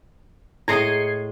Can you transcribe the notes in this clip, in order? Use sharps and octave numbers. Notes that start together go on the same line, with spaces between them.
A2 G#3 E4 D#5 G#6 C7 C#7